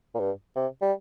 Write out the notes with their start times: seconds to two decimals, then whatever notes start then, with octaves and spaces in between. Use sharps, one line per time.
0.15 A#2
0.20 G2
0.56 C3
0.82 G3